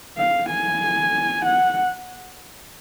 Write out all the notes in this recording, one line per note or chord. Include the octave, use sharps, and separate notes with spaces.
F5
G#5
F#5